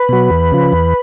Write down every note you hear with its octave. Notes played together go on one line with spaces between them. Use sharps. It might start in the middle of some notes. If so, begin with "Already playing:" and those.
Already playing: B4
B2 F#3
E2
C#3 F3
E2